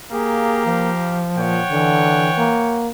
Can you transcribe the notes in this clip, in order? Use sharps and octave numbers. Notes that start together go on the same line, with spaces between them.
A#3 G4 G#4 F5 A#5
F3
A#2 C#5 F#5 G5
D3 E3
A#3